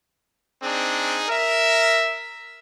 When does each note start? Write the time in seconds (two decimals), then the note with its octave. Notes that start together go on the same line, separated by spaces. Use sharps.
0.62 C4 D4 D#4 G#4
1.29 A#4 E5